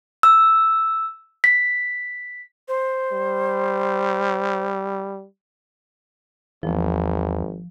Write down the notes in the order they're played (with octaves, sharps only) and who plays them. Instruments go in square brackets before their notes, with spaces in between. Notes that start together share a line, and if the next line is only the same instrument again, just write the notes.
[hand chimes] E6
B6
[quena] C5
[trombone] G3
[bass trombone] G#1 [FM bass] E2 [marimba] F3